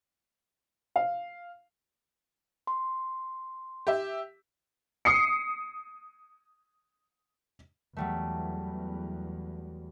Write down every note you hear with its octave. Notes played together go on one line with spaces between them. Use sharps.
F5
C6
G4 E5
D#6 C7 C#7
E2 F#3 G3 A3